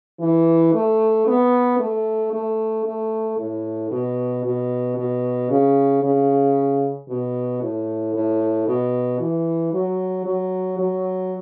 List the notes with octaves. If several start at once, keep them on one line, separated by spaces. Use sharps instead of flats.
E3
A3
B3
A3
A3
A3
A2
B2
B2
B2
C#3
C#3
B2
A2
A2
B2
E3
F#3
F#3
F#3